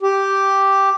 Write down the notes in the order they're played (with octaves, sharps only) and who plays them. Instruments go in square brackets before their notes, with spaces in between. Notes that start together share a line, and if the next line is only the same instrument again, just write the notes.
[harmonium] G4